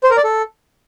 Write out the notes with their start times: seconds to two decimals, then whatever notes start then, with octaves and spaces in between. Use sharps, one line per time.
0.03 C5
0.10 A#4
0.17 D5
0.24 A4